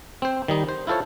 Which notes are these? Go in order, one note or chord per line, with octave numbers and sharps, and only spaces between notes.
C4 C5
D#3 G3 D#4
C5
E4 F4 A4 C5 C#5